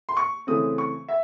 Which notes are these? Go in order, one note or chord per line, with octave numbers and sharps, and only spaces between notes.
C6
C#6
C#3 E3 A3 C4 D#6
C#6
E5